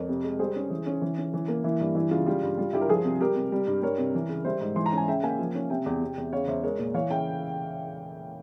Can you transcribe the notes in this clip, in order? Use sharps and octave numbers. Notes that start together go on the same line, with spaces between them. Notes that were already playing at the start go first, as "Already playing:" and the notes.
Already playing: F2 A#4 C#5
C3
G#3
G3 G#4 C5
C#4
E3
C#4
E3
C#4
E3
A#3
E3 E4
G2
E3 E4
C#3 F4
G3 F4
G2
G3 F4
G2 E4 G4
A#4
F3 F4 G#4
C3
G3 G4 A#4
C3
G3
G2
G3 A#4 C#5
C3
E3
C#3
G3 C5 E5
G#2
E3 C6
A#5
C#4
G#5
C#3 E5 G5
A#3 F5 G#5
F3
C#4
C3 E5 G5
E2
C3
E2
C#3 C#5 F5
E2 C5 E5
G#3 A#4 C#5
A#2
E3 C#5 F5
C#3 E5 G5